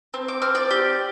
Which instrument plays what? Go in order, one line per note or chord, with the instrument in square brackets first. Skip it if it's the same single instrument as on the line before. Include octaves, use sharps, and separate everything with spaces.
[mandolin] C4
D6
C4 F6
D5 D6
G4